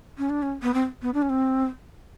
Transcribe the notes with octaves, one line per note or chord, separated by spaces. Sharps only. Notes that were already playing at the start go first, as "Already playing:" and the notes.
C#4
D4
C#4
B3
C4
B3
D4
C#4
C4